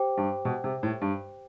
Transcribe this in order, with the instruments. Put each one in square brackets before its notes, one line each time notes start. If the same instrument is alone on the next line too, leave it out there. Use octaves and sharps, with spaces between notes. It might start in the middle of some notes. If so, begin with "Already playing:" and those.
Already playing: [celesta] G4 C5 G5 D6
[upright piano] G2
B2
C3
A2
G2